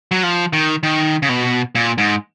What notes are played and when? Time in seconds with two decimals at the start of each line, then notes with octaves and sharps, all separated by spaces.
0.11 F#3
0.23 F3
0.53 D#3
0.83 D#3
1.22 C#3
1.29 B2
1.75 A#2
1.98 G#2